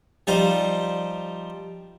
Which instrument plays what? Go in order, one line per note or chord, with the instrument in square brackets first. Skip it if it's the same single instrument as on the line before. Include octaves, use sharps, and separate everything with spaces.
[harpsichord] F3 G3 D#4 C5